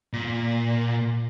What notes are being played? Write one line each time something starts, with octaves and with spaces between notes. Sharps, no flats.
A#2